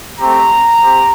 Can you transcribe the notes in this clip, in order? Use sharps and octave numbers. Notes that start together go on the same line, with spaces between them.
A3 C4 G4 A#5
C4 G4